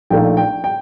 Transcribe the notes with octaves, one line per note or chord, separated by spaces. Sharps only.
A#1 A#2 A3 D#4 G5
G5
G5